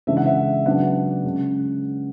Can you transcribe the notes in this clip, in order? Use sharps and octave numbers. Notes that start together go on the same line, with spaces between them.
C#3 E3 G#3 D4 E5
F#5
E5
C#3 F#3 B3 D4 F#5
C#3 G#3 C#4